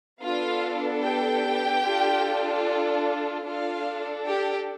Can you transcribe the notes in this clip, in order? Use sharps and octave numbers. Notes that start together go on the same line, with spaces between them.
B3 D4 F4 A4 F5
G4 G5
D4 F4 A4
D4 F4 A4 F5
G4 G5